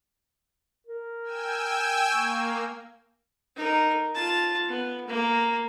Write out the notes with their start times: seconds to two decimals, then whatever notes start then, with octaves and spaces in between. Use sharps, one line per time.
0.87 A#4
1.23 G5 G#5 E6
2.11 A#3 C#6
3.56 D#4 A#4
4.15 F4 A5
4.68 B3
5.07 A#3